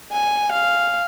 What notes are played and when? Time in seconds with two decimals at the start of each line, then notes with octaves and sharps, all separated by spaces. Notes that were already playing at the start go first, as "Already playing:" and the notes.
0.12 G#5
0.52 F5